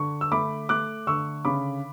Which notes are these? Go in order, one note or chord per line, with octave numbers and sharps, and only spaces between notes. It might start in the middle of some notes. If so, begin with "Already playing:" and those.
Already playing: D3 C#6
E6
A3 B5 D6
A3 D6 F#6
D3 C#6 E6
C#3 B5 D6